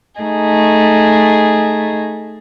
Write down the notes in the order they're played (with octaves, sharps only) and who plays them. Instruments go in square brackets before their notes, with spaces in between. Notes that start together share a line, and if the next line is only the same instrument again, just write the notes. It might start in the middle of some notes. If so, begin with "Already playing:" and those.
[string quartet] A3 D#4 G#4